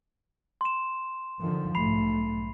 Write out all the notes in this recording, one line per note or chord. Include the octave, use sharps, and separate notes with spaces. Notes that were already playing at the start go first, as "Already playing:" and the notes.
C6 E7
D3 D#3 F3
B1 G#2 A3 B5 C7 F7